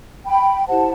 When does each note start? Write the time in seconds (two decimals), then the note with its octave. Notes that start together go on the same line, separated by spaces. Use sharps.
0.26 G5 B5
0.67 E4 G4 C5 F#5 A5